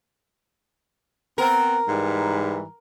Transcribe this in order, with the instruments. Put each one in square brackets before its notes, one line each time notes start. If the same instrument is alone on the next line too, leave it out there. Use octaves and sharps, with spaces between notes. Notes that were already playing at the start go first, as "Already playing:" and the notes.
[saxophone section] B3 C4 [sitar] A#4
[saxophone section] G#2 E3 G3